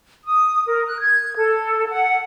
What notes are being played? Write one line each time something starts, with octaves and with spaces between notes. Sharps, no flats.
D#6
A#4
F#6
G#6
A4
F#5